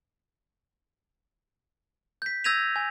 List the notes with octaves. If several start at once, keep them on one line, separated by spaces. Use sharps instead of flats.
G6 B6
E6 G6 G#6 A#6 D#7 F7
G#5